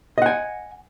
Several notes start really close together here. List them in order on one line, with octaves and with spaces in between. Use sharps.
D#5 F#5 G#5